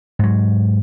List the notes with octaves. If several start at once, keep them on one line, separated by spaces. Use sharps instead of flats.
G#2 F#3